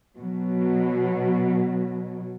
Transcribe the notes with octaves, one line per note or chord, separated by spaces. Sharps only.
B2 F#3